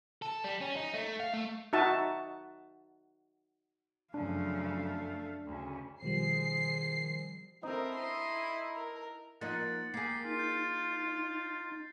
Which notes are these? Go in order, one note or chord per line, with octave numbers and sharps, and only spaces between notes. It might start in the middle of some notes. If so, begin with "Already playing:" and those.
A4
G3
C#4
D#4
A3
F5
A3
D#4 F#4 E5 A5
F#2 C#3 F3 A3 D4 F5
D2 C#3
B2 D#3 F3 G3 G#4 C5 C7
C4 D#4 E4 A4 A#4
D#5 C6
A#4
F3 A#3 D#4 F#5 A6
A#3 G4 G#4 C7
D#4 F4
G6 A6